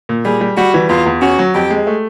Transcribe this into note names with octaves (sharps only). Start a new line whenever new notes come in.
A#2
G3 G#4
G3
G3 F#4
E3
E2 F4
E2
C#4 F#4
F#3
F2 G4
G#3
A3